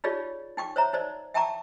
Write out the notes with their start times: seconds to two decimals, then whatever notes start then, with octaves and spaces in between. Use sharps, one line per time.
0.04 D#4 F4 G4 G#4 C#5 D5
0.57 D#4 G5 C#6 D6
0.76 C5 C#5 E5 A#5
0.93 D#4 C5 D5
1.34 E5 G5 A5 A#5 C#6 D6